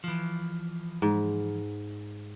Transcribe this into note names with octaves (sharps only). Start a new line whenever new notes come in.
E3 F3
G#2